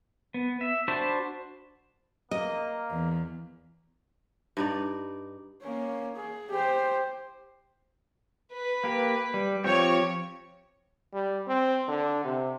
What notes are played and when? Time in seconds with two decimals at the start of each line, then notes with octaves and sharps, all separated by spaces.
0.34 B3
0.61 E5
0.88 D4 F#4 C5 A5 B5
2.31 A#3 D#5
2.90 E2
4.57 G2 D#4 D5
5.63 A#3 C#4
6.16 G#4
6.51 G4 C5
8.53 B4
8.84 A#3 G4
9.34 G3
9.64 F3 C4 G4 C#5 C#6
11.13 G3
11.47 C4
11.88 D3
12.24 C3